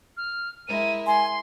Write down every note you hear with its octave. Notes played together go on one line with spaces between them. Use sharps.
F6
G#3 E4 A#4 D#7
G#5 C6